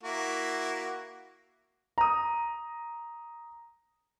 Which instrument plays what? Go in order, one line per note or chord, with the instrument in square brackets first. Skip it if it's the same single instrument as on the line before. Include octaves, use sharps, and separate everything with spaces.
[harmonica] A#3 E4 F#4
[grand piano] A#5 D#6